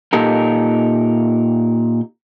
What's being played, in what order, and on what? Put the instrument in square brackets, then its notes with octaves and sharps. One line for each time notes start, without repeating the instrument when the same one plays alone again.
[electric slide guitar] A#2 D#4 G4 A4 A#4